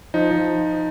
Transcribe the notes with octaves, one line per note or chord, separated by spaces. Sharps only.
F3 D#4
F3